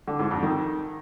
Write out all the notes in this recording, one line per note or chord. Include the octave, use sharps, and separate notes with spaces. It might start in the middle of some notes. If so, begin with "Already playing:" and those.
D3
G#2
F2
D#3